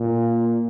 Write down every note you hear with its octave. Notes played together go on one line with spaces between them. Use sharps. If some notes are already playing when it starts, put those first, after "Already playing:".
Already playing: A#2